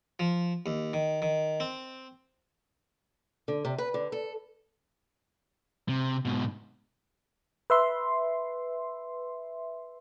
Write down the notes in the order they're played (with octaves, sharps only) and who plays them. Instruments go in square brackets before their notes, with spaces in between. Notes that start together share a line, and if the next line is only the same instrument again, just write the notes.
[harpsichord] F3
D#2
D#3
D#3
C4
[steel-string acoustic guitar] D3
C3
B4
D3
A4
[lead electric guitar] C3
G#2 B2
[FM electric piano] B4 E5 C6